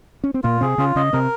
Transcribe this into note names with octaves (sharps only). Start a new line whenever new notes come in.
C#4
C4
A#2 A#3 F4
C3 C4 G#4
C#3 C#4 F4
C#3 C#4 D#5
C3 C4 A#4